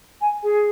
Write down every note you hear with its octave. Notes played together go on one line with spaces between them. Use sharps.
G#5
G#4